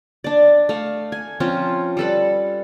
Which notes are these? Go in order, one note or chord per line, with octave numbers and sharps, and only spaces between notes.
D4 D5
A3 F5
G#5
F3 C4 C#4 F4
G3 A4 B4